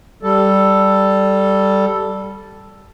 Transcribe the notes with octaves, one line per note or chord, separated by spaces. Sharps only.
G3 A4